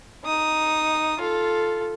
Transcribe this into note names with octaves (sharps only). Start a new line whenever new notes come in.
D#4 D#6
F4 A4